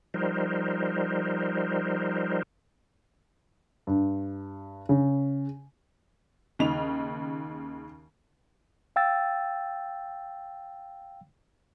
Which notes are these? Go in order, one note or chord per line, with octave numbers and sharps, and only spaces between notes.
F3 G3 D#4 A#4 C5
G2
C#3
D#2 C#3 D#4 F7
F5 G5 E6 A6